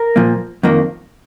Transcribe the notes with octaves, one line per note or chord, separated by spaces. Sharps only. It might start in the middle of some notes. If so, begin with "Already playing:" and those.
Already playing: A#4
A#2 F3 A#3
F2 D#3 A#3